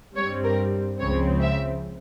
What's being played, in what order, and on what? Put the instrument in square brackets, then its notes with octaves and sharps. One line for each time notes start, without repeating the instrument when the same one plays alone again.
[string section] G2 G3 C4 C#5
A#4
C#2 C#3 F3 C4 C#5
E5